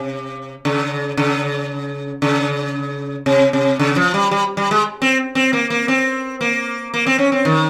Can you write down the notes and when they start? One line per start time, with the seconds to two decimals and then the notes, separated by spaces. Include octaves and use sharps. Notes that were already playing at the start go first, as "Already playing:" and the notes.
Already playing: C3
0.65 C#3
1.17 C#3
2.22 C#3
3.26 C3
3.53 C3
3.79 C#3
3.96 F3
4.14 G3
4.31 G3
4.57 G3
4.71 G#3
5.02 C4
5.35 C4
5.53 A#3
5.70 A#3
5.88 C4
6.41 A#3
6.94 A#3
7.07 C4
7.19 C#4
7.32 C4
7.45 D#3